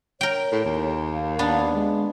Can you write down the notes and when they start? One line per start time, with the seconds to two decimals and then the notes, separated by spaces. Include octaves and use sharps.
0.21 A#4 C#5 G5
0.52 A2
0.65 D#2
1.13 F5
1.39 B3 D4
1.74 G#3